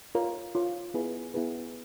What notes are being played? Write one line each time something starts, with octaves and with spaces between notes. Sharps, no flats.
F4 A#4 C#5 F5
F4 A#4 C#5 F5
B3 E4 G#4 B4
B3 E4 G#4 B4